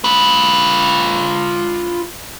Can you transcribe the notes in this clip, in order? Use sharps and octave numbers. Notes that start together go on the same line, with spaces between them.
F4 B4